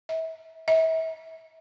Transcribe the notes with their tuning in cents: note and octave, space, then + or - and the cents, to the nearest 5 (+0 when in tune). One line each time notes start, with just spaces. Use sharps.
E5 -30
E5 -35